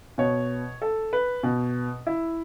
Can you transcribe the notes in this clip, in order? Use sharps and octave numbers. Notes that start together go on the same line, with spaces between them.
B2 C#5
A4
B4
B2
E4